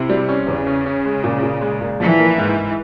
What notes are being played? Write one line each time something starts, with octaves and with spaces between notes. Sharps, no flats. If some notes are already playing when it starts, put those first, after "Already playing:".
Already playing: C3 E4
G3
C#4
E2 C#3
C#4
C#4
G#3
A#2
A#2
G#3
A#2
E3 F3
A#3
G#2
G#2